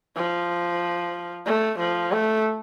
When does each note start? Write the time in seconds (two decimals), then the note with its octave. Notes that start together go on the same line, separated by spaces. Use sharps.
0.16 F3
1.46 A3
1.79 F3
2.12 A3